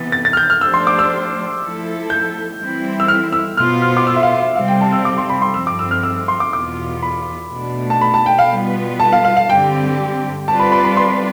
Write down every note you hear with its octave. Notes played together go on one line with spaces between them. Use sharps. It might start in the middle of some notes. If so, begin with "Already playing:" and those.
Already playing: C3 E3 B3 A6
A6
A6
F6
G6
F6
F3 A3 D4 G4 C5 E6
C6
D6
E6
F3 A3 E4 A4
G6
E3 G3 C4 E4
E6
F6
E6
B2 B3 F4 C5 F6
F6
D6
E6
E5
F5
E5
C3 G3 C4 F5
G5
A5
E6
D6
C6
B5
C6
G2 F3 C4 E6
D6
E6
F6
E6
E6
C6
D6
E2 B2 B3 F4 D6
B5
B2 A3 D4
A5
B5
A5
G5
F5
B2 G3 B3 F4 B4
A5
F5
F5
F5
G2 D3 G3 C4 G4 G5
G3 C4 F4 B4 D5 A5
B5
B5
B5
C6